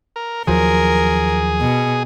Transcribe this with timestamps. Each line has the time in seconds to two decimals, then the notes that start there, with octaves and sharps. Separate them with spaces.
0.16 A#4
0.47 D#2 F3 F#3 G#4 A#4
1.61 B2